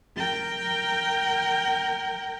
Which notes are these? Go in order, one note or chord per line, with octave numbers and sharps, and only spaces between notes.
A#4 G5